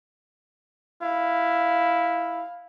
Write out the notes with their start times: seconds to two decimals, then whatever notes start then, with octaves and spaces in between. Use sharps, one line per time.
1.02 E4 F5